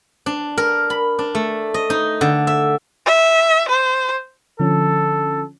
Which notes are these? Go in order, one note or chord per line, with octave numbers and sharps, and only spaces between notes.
D4
A#4
B5
D4
A3
D#5
D#4
D3
E5
E5
C5
D3 F3 C#4 A4